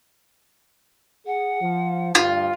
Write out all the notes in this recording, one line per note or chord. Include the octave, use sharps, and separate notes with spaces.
G#4 F#5
F3
D2 G2 F4